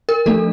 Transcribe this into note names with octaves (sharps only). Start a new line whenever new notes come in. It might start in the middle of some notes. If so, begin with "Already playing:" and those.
A#4
F3 A3 D4 A4